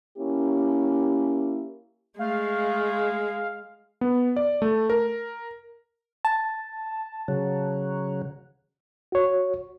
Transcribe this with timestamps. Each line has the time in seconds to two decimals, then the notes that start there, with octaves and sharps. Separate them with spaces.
0.17 A#3 C#4 E4 G4
2.19 G#3 A3 F5
4.01 B3
4.36 D5
4.62 A3
4.90 A#4
6.25 A5
7.28 C#3 F#3
9.12 F#4 C#5